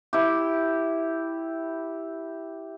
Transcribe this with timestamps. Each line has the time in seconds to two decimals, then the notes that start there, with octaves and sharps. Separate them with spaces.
0.13 E4 G4